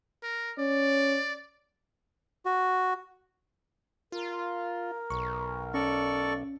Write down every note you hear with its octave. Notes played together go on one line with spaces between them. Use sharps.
A#4
C#4 D5
F#4
F4 A#4
B1 C#6
C#4 A4 D5 C#6